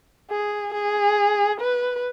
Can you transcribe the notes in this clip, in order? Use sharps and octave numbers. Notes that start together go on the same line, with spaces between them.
G#4
G#4
B4